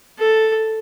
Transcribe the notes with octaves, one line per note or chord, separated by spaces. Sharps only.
A4